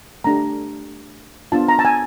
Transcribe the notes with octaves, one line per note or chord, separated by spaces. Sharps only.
A3 D4 G4 A#5
B3 D4 F4 A5
A#5
A5
G#5